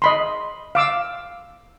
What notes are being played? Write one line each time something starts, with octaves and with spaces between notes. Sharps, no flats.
D#5 B5 C6
F5 D6 E6